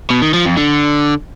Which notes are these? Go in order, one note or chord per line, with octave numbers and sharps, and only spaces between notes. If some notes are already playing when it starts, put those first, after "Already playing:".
B2
D#3
F3
F2
D3